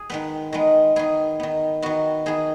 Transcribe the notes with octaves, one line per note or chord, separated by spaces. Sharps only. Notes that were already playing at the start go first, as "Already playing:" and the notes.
Already playing: G#4
D#3 G#3 B3 B4
D#3 G#3 B3
D#3 B3 G#4
D#3 B3
D#3 B3 F#4
D#3 B3 G#4